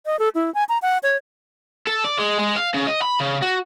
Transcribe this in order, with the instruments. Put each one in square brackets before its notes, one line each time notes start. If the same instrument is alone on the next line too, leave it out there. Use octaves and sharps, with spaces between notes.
[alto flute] D#5
A4
E4
G#5
A#5
F#5
C#5
[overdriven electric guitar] A4
D5
G#3
G#3
F5
C#3
D#5
B5
C#3
F#4